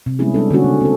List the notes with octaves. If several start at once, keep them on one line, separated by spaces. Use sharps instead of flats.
C3
G3 G#3 B3 C#4 E4 G#4
G3 G#3 D4 A4
D3 G#3 A#3 C4 C#4 F#4
C#3
C4 A4